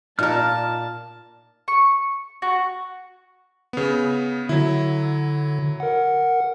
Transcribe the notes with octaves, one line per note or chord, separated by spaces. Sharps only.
A#2 D#4 F4 A#4 D5 A5 F6
C#6
F#4
C#3 B3
D3 F#3 E4
A#4 F#5